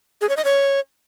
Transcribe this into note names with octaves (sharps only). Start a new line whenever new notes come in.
G#4
C#5
D#5
C#5